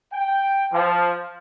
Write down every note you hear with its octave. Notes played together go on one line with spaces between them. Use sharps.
G5
F3